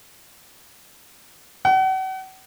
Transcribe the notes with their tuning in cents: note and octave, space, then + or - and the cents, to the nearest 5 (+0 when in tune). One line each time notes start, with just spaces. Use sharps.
F#5 +40